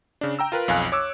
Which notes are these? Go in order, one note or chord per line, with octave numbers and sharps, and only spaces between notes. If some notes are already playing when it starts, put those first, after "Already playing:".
C#3 D4
G5 A#5 E6
F4 A#4 B4
B1 F2 F5 G#5 F#6
C#5 D6 E6